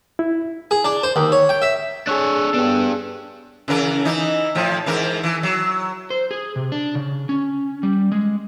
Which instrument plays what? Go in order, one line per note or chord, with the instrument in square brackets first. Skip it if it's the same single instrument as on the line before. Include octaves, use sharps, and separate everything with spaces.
[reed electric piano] E4
[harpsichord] G#4
D4
C5
D#2
C#5
G5
E5
[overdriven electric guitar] D4 C#5 [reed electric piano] G#4 F#6 [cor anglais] A4
[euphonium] B3 [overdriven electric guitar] D4 G4
[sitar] C#3 E3 A#4
E3 D#4
A2 F3
G#2 E3 A#4
E3
F#3
[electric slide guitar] C5
G#4
C3
D4
C#3
C#4
G3
G#3